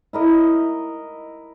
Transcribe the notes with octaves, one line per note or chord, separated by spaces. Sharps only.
E4 A#4 D#5